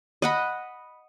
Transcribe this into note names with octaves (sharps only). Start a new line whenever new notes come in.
D#5 F#5 B5